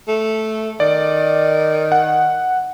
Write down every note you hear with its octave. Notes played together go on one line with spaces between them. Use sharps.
A3
D#3 D5
F#5